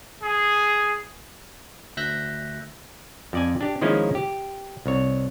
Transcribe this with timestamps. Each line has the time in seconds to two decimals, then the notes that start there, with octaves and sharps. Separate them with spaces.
0.22 G#4
1.97 D2 E5 E6 F#6 G6 A#6
3.33 F2 D5 G#5
3.61 D4 G4
3.81 D#3 F3 G#3 A#3 C#4 E4
4.15 G4
4.86 C2 C#5